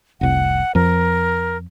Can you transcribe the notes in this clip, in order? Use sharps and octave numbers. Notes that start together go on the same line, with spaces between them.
F1 C2 F#5
F2 F3 A#4